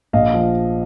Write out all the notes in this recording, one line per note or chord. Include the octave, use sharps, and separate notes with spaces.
A#1 D#5 F5
F3